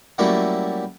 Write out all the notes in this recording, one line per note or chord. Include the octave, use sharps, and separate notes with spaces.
F#3 G3 A3 A#3 C#4 E4